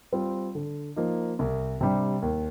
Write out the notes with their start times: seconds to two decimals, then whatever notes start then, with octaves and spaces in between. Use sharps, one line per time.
0.12 G3 C4 F4
0.55 D3
0.96 F3 A#3 D#4
1.39 C2
1.81 C3 G3 D4
2.22 D#2